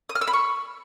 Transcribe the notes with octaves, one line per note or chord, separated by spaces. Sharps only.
D#6
F6
E6
B5
C#6